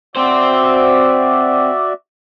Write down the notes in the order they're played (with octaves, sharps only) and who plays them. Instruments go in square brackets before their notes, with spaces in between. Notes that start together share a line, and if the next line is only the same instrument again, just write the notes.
[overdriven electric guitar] C4 C5 [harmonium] F#4 D5 E5